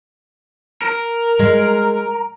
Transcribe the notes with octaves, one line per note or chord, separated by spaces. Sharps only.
A#4
G#3